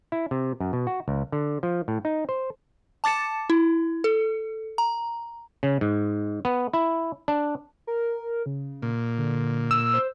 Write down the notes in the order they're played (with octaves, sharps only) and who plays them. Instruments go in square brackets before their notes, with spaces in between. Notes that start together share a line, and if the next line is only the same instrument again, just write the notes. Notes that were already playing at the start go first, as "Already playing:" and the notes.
[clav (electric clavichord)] E4
C3
F#2
B2
F#4
C#2
D3
F3
A2
D#4
C5
[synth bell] A5 D6 A6 C#7 E7
E4
A4
A#5
[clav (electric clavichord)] C#3
G#2
B3
E4
D4
[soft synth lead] A#4
C#3
[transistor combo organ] A#2
[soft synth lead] D3
[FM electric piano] E6
[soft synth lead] C5